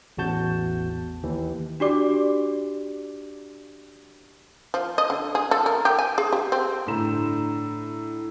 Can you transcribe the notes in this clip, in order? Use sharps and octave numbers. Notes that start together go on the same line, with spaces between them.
A1 E2 F#4 A5 G6
D#2 E3
D4 F#4 G4 D5 D6
F3
D#5
D3
G#4
A4
A#4
G4
G#5
G#4
G4
C4
A2 D3 D4 A#5 E7